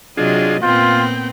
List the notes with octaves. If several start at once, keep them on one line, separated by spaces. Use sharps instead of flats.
C3 F#3 D4 F4 G#4 D#5
A#2 B3 C4 F4 G5